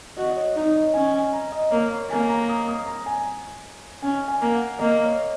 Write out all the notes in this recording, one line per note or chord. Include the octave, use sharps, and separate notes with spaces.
F#4 D#5
D#5
C#5
D#4 C#5
D#5
C#4 G#5
G#5
A#5
D#5
A#3 C#5
C#5
A#3 G#5
A#5
D#6
D#6
A#5
G#5
C#4 G#5
G#5
A#3
F#5
A#3 D#5
C#5